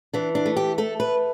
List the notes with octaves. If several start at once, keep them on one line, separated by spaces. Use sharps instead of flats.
E3 D4
D4
A3
G4
A3 A4
B4